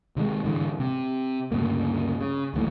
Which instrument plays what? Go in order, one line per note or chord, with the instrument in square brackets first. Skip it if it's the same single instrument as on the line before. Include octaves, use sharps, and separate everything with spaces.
[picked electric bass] C3 D#3 F#3 G#3
G#2 D3 E3
C3
D2 G2 C#3 A#3
C#3
D1 A1 D#2 A2